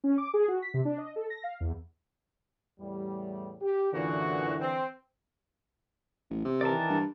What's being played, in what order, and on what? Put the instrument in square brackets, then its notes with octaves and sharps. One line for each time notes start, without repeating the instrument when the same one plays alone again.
[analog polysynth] C#4
D6
G#4
F#4
B6
C3
D4
D#5
A4
A#6
F5
E2
[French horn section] E2 A2 G3
G4
[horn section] F#2 A#2 F#4 [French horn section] D3 E3
[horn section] C4
[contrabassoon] A1
C3
[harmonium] D#3 E3 A#4 [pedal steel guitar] D5 A5
[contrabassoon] G2